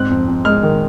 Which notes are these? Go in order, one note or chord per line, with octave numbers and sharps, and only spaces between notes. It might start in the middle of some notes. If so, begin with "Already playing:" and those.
Already playing: G#2 C4 F#6
F2
F2
G#3 F6
D#3